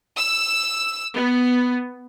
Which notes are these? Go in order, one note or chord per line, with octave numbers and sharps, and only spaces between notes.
E6
B3